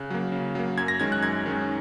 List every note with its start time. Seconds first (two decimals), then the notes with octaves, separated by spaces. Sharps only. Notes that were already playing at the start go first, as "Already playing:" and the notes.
Already playing: C#3 F#6
0.10 F#3 A#3
0.32 C#3
0.55 F#3 A#3
0.77 F#2 G#6
0.88 A#6
1.00 D#3 G#3 C#4 G#6
1.12 F#6
1.23 F#2 G#6
1.46 D#3 G#3 C#4